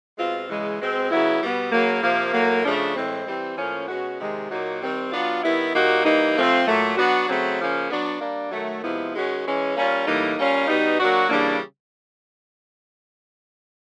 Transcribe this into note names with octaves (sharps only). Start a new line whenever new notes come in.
B2 G#3 C4 F4
C#3 E3 G#3
B2 G#3 C4
C#3 F#3 B3 E4
B2 G3 B3
C#3 F#3 A#3
C3 F3 A#3
A2 F#3 A#3
C#3 F3 A3 D4
A2 E3 G#3 C4
E3 G3 C4
A2 F3 A#3 C#4
B2 G#3 C#4 F#4
C3 D#3 G#3
A#2 F#3 A#3 D#4 F#4
D#3 G3 C4
F#3 B3 D4 F4
D#3 G3 B3 E4
A#2 G3 A#3 D#4 F#4
E3 G3 A#3 D#4
F3 A3 C4 F4
A#2 F#3 A3
F#3 B3 D4 F#4
C#3 F#3 A3 C4
C#3 F3 A#3 C#4
F#3 B3 D4
G3 A#3 D4
D#3 F#3 A3
C3 F3 G#3 B3 E4
D#3 G#3 C#4 F#4
E3 G#3 C#4
G3 A#3 C#4 F4
A2 E3 G3 A#3 D#4
G3 A#3 C#4 F4
B2 G3 B3 D#4
F#3 A#3 D4 F#4
C#3 E3 G3 A#3 D4